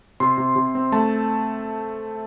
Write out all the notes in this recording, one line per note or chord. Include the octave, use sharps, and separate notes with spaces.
C3 C6
C3
C3
C4
A3 A5